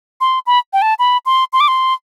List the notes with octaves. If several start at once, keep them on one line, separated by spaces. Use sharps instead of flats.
C6
B5
G5
A5
B5
C6
C6
D6
C6